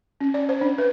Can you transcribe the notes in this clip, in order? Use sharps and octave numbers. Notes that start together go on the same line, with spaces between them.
C#4
D5
C5
D4
B4